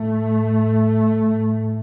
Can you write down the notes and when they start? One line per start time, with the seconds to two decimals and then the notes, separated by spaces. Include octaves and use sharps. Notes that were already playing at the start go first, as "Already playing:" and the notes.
Already playing: A2 A3
1.25 A2